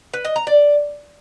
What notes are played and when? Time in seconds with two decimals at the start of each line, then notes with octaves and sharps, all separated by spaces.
0.14 B4
0.25 D#5
0.36 A#5
0.47 D5